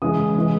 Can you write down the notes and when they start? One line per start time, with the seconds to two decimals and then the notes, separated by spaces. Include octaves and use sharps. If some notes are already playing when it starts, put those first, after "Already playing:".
0.02 C#3 E3 G#3 D#6
0.36 C#3 E3 G#3